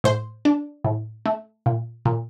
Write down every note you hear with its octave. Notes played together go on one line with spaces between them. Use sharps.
A2 C5
D4
A2
A3
A#2
A#2